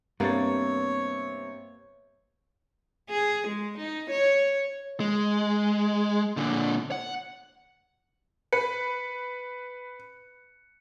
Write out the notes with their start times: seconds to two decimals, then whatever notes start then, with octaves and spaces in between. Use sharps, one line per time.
0.20 G2 C3 A#3 B3 C#5 A6
3.11 G#4
3.48 G#3
3.79 D#4
4.11 C#5
5.00 G#3
6.37 A#2 D3
6.92 F#5
8.53 B4 C#7